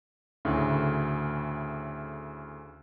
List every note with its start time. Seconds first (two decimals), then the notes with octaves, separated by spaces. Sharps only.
0.45 D2 A2 C#3